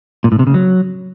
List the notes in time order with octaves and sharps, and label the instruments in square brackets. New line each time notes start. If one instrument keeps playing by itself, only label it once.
[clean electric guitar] A#2
A2
C3
C#3
F#3